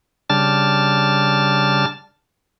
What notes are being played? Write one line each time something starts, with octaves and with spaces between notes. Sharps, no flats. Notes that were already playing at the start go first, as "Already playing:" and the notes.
C#3 G3 D4 A5 F6 A6